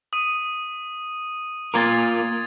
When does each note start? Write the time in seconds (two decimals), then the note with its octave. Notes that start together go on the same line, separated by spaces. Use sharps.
0.13 D#6 D#7
1.74 A#3 F4 A#4 D6 G#6 A6